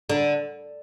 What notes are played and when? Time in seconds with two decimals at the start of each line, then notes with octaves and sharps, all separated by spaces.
0.10 D3